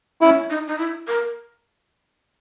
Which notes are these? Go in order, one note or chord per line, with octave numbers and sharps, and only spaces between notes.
C#4 E4
D#4
D#4
E4
A#4